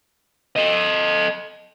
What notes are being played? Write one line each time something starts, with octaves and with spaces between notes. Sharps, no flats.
A4 D#5